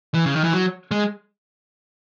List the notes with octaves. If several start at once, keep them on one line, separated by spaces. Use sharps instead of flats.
E3
C#3
D#3
E3
F#3
G#3